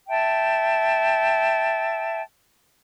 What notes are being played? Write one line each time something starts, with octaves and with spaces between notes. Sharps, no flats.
E5 G5 A5